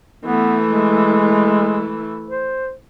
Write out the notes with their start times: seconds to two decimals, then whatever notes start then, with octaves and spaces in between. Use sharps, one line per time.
0.24 E3 A3 B3
0.64 G#3
2.27 C5